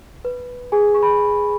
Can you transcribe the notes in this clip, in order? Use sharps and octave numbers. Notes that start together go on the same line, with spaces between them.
B4
G#4 G#5
C#6
B5